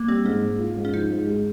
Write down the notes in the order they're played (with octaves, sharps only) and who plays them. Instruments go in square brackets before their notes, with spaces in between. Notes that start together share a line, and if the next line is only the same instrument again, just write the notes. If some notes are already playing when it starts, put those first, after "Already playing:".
Already playing: [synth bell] A#3
[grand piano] G3 [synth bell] C4
[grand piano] G#2 [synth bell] C#4
[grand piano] G#2
F4
G#2
[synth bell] C#4
[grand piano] F3 [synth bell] D#4
[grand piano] G#2
G#3